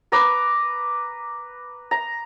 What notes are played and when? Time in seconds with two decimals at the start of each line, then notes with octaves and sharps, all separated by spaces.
0.12 B4 A#5 D6
1.91 A#5